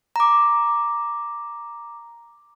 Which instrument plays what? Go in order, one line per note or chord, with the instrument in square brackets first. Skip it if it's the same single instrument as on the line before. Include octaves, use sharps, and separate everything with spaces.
[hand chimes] A#5 D6